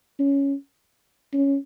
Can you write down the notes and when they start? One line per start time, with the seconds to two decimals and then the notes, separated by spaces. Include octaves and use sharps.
0.20 C#4
1.33 C#4